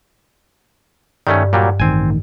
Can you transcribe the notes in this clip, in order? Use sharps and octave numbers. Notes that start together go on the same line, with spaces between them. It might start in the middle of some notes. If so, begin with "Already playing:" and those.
G2 D#3 A3 C#4 D5
A#2 F#3 G3
A1 D#3 C4 G#5